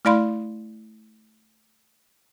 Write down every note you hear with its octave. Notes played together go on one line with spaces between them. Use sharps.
A3 E4 D5 F5 B5 C6